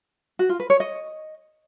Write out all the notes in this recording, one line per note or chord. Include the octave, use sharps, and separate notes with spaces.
F#4
F4
B4
C#5
D#5